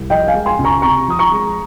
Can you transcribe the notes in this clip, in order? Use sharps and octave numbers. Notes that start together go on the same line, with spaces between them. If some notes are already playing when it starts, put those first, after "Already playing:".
Already playing: C2
F3 D#5 G5
F5 G#5
G#3
G#5 C6
C#2
A#5 C#6
C3 A#5 C#6
F3 D#6
A#5 C#6
G#3